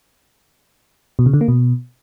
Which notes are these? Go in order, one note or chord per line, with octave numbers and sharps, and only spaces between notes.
B2
C#3
D3
A#3
B2